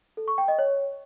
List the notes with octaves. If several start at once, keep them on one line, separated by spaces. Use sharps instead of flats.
A4
C#6
G5
D#5
C#5